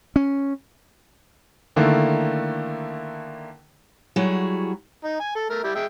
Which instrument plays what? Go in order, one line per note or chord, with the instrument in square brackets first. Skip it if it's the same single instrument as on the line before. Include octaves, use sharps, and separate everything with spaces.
[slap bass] C#4
[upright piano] D3 D#3 A3 A#3 E4
[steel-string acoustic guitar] F#3 G3 E4 F#4 G#4
[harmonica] D#4
G#5
A4
A3 A#4
G3 E4 G4
G#3 E5 G5